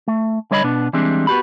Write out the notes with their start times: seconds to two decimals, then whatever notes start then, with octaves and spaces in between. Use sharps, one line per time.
0.08 A3
0.51 D3 G3 C#5 D#5 G5 B5
0.64 B2 B3 D4
0.93 E3 G3 G#3 C4 D4
1.27 B3 F#4 G4 B5